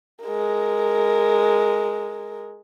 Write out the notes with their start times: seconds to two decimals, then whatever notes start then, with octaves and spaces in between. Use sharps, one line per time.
0.23 G#3 A#4